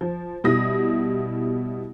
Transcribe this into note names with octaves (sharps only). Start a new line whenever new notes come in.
F3
B2 G3 E4 D#6 A#6